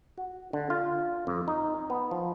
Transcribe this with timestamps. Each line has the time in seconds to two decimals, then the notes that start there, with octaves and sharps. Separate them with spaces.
0.18 F#4
0.53 D3
0.70 F4
1.27 F2
1.48 D#4
1.90 B3
2.11 F3